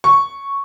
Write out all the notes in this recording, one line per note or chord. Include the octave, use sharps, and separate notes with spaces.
C#6